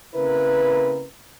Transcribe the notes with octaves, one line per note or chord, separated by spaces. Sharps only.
C#3 A#3 C4 E4 A#4 B4